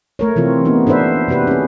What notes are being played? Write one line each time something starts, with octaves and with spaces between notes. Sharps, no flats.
A3 A#4 C#5
C3 E3 C4 F4
A#3 B3 D#4
D4 A4 B4 C5 E5
C3 D4 F#4 G4 B4
C#4 G#4